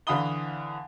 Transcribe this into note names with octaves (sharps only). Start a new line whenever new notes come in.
D3 E3 F5 B5 D#6 G7